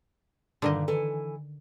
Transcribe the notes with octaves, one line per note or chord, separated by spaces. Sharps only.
G2 A#2 D3 D#3 A#3 D#5
E3 A4 G#5